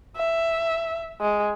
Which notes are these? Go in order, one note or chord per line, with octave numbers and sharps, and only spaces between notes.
E5
G#3